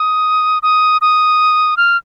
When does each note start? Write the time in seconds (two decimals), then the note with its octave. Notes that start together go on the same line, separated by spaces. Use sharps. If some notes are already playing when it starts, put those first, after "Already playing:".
Already playing: D#6
0.63 D#6
1.01 D#6
1.77 F6